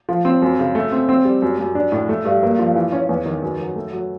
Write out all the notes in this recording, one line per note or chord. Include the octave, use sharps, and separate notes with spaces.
F3
C4
F#2
C#3
A3
C4
C4
G3
F#2
F#2
D4
A2
A3
G2
A#3
F3
E3
C#4
E2
D#3
F#2
F#3
A3
F#3